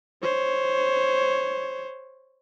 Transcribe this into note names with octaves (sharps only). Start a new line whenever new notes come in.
C5 C#5